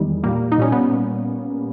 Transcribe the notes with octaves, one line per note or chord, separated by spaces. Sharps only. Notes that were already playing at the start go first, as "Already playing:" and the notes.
Already playing: E2 D#3 G3 G#3
A#2 G3 A#3
D#4
A#2 G3 C#4
B3